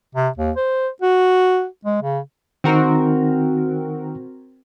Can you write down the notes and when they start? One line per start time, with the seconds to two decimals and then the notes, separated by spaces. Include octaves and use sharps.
0.15 C3
0.38 D#2
0.57 C5
1.02 F#4
1.85 G#3
2.02 C#3
2.64 D#3 C4 D#4 F#4 A#4